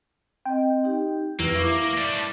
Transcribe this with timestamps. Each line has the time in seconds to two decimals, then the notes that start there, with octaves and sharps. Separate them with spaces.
0.45 C4 D#5 G5
0.84 D#4 G4
1.39 F2 E3 A#3 B4 E6
1.55 E4 C#6 D6
1.98 G3 D4